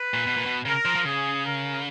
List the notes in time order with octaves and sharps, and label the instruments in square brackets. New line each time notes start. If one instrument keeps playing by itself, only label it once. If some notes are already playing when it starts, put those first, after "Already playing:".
Already playing: [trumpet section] B4
[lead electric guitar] A#2
B2
A#2
B2
[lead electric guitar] C#3 [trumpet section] A#4
[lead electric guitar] F3
F3
[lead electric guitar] C#3 [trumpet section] G#4
[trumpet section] A#4